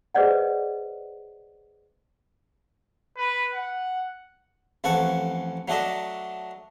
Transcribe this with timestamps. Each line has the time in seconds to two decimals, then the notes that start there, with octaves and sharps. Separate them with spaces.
0.15 G#4 B4 C5 D5 D#5 F#5
3.17 B4
3.54 F#5
4.84 A1 F2 A4 F#5 C#6
5.68 F#3 A3 D4 D#5 E5